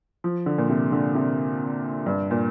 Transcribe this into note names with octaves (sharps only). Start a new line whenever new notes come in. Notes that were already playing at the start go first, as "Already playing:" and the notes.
F3
D3
A#2
C3
D3
C3
G2
A#2